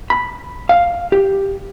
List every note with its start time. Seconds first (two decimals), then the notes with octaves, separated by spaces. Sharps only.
0.10 B5
0.69 F5
1.12 G4